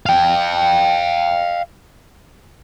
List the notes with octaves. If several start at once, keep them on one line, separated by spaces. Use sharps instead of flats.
F5 G5